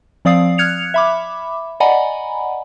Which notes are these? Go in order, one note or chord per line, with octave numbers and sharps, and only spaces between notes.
F3 C4 D5 F5 D#6 C7
F6 F#6 G#6 C#7 F7
E5 B5 D6
D5 D#5 F#5 G#5 A#5 B5